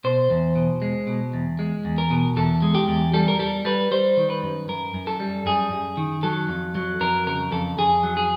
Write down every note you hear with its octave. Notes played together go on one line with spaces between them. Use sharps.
B2 C5
E2
B2
G#3
B2
E2
G#3
E2
A#4
B2
E2 A4
G#3
G4
E2
G3 A4
A#4
G3 A4
G3 B4
G3 C5
D#3
B4
F#2
F#2 A#4
F#2
A4
G3
F#2 G#4
F#2
D#3
F#3 A4
F2
F#3
F2 A#4
C#3 A#4
F2 A4
F2 G#4
F#3
G#4